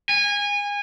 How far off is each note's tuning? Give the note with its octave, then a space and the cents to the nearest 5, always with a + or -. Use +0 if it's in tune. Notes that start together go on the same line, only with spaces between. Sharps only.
G#5 -25